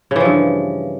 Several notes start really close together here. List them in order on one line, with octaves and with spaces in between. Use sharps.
C#3 E3 F3 G2